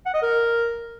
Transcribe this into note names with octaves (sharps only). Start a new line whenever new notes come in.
F#5
D#5
A#4